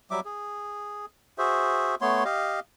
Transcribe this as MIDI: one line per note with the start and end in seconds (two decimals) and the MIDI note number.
0.11 0.20 54
0.11 0.20 55
0.11 0.20 76
0.11 0.20 86
0.25 1.06 68
1.38 1.95 66
1.38 1.95 68
1.38 1.95 72
1.38 1.95 76
2.01 2.24 57
2.01 2.24 59
2.01 2.24 73
2.01 2.24 84
2.25 2.60 67
2.25 2.60 75
2.25 2.60 77